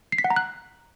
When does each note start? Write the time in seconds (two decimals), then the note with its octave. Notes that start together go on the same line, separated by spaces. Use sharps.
0.12 C7
0.18 B6
0.24 F#5
0.30 A#5
0.36 F#6